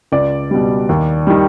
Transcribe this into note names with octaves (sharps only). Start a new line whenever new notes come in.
C#2 D5
B2 G3
D#2
D#3 G3